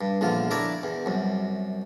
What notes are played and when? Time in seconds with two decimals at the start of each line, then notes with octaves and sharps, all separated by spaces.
0.01 G2
0.21 A#1 E2 D3 F4
0.51 D4 E4 A#4 C#5 D5
0.83 E2
1.06 C2 F#2